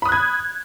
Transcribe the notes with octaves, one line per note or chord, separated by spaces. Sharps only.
B5 D#6 F#6 G#6